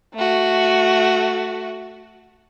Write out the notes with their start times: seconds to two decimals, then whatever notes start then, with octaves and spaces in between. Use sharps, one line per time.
0.15 A3 F#4